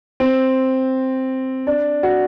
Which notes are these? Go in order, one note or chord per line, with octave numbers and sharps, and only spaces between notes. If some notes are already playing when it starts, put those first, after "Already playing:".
C4
D4
F#4